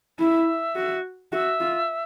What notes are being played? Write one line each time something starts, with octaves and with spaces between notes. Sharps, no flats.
E4 E5
F#4
F#4 E5
F4